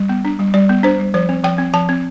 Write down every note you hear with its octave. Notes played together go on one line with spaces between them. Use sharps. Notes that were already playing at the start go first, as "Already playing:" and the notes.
Already playing: G3
B3
D4
G3
G3 D5
B3
D4 C5
G3
F3 C5
C4
F3 G5
C4
F3 A5
C4